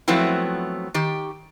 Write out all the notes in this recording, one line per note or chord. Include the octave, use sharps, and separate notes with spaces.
F3 F#3 A3 B3 C4 E4
D#3 G4